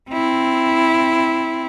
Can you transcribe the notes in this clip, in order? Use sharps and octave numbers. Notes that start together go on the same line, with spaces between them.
C4 E4